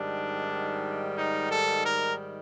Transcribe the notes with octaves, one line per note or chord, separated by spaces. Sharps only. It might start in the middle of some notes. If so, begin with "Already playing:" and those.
Already playing: G#2 D#3 G3 D4
D#4
A4
A#4